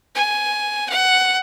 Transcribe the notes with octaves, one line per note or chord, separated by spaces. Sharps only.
G#5
F#5